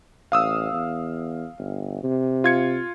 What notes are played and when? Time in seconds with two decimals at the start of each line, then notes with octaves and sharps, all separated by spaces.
0.32 A1 F5 D#6 E6
0.73 E2
1.59 G1
2.03 C3
2.44 F4 G#6 C#7